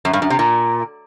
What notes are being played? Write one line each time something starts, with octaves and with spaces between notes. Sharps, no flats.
F#2
G2
F#2
C3
A#2